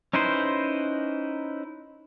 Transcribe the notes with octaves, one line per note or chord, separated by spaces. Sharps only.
C#4 D#4 E4 B4 C5